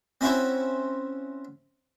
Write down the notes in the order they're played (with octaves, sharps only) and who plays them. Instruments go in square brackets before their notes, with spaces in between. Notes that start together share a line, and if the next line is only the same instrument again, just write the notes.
[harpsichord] C4 C#4 E4 F#4 C5 C#5